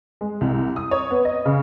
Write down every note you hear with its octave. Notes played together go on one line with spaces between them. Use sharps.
G#3
C2
D#6
C#5
B3
D#5
C#3